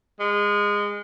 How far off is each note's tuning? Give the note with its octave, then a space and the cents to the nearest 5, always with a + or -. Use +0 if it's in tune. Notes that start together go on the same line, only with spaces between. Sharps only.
G#3 -20